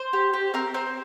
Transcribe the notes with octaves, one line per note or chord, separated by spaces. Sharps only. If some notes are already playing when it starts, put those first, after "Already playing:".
Already playing: C5
G4
G4
C4 A#4
C4 C5